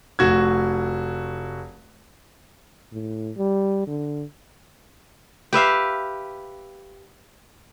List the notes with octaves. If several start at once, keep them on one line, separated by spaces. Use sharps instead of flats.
F1 F#4 G#6
A2
G3
D3
G4 B4 E5 F5